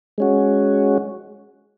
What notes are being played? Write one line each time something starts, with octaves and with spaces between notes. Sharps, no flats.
G#3 C#4 F#4